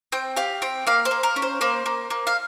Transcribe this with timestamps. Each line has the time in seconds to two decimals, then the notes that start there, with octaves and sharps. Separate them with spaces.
0.12 C4 G5
0.36 G4 F5
0.62 C4 G5
0.87 A#3 F5
1.05 C5
1.11 A#3
1.23 A#4
1.36 C#4
1.42 C5
1.61 A#3 C5
1.86 A#3
2.10 A#3
2.27 F5